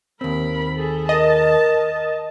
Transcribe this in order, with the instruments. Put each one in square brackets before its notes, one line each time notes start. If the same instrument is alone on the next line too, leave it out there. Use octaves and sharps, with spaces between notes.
[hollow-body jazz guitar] D#2 C4 [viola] A#4 B5
[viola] G#4 A4
[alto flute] A#4 [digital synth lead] D#5 [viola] A5